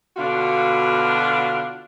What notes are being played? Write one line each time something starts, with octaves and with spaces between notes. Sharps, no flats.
B2 D3 D4 F4 F#4 F5